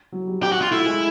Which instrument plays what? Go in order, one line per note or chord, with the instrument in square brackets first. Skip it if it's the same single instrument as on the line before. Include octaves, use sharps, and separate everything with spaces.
[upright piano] F#3
G3
[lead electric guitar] G4
F#4
F4
[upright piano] A3 [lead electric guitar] E4
[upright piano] G#3